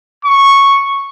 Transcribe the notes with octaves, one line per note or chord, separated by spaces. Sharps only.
C#6